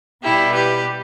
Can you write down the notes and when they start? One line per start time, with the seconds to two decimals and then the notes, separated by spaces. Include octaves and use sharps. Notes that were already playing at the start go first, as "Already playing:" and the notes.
0.23 B2 G3 E4 G4
0.53 G4 B4